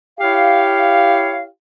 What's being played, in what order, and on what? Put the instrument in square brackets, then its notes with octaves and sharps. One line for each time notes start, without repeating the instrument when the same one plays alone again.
[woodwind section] E4 C#5 F5 [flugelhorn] G4